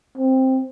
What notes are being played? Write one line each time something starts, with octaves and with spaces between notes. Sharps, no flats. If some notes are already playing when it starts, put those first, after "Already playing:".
C4